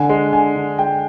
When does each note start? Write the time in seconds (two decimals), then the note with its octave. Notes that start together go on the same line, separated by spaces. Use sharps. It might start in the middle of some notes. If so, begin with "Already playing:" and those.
Already playing: D3 G#5
0.09 G#3
0.33 D3 G#5
0.56 D3
0.79 G#3 G5